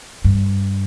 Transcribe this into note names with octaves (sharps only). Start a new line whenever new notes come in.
G2